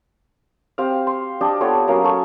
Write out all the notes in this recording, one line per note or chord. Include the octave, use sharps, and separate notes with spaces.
C4 G4 F5
C6
D4 G4 D#5 A5
B3 F4 A4 C#5
F#3 A#3 C#4 F5
A4 C#6